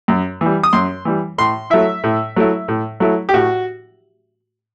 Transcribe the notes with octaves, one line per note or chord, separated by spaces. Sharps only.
F#2
E3 G3
D#6
F#2 C6
E3 G3
A2 C6
F#3 A3 E4 E5
A2
F#3 A3 E4
A2
F#3 A3 E4
G4
A2 F#4